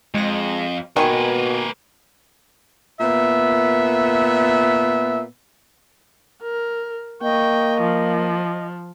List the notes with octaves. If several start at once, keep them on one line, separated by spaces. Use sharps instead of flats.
F2 G#3 A#6
B2 D#3 A#3 B4 G#5 C6 C#6
A#2 B3 E5
A#4
A#3 D#5 G5 C#6
F3